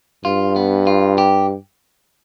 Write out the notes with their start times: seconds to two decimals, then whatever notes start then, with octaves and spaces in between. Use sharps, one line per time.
0.25 G2 F4
0.56 B3
0.87 F4
1.18 G4